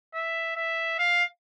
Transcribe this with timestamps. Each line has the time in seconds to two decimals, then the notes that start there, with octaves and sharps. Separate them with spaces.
0.14 E5
0.56 E5
0.99 F5